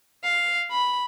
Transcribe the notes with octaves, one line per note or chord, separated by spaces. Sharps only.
F5
B5